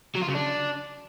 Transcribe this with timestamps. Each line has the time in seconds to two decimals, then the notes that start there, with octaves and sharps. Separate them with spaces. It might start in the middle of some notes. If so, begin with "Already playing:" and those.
0.16 F#3
0.22 F4
0.28 C#3
0.35 D4